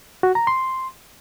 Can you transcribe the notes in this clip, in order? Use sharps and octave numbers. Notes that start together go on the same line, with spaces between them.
F#4
A#5
C6